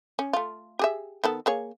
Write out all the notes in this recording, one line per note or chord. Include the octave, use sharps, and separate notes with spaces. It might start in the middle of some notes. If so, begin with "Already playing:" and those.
C#4
A3 F4
G4 G#4 E5
D#3 B3 A4
A#3 G#4 C#5